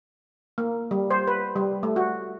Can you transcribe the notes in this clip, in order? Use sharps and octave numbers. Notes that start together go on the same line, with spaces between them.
A#3
G3
C5
B4
G3
A3
F#4